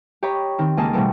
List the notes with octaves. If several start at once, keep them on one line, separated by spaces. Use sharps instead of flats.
G4 C#5 D#5 A#5 B5
D#3 C4
C#2 A#3 D#5 G#5 A5
B2 G3 A3 B3 C4